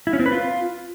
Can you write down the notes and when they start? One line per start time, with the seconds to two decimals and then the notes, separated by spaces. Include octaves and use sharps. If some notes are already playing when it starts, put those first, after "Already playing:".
0.07 E4
0.13 C#4
0.19 C4
0.26 B4
0.32 F4